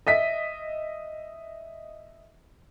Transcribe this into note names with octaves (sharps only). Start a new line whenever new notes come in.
D#5 E5 B6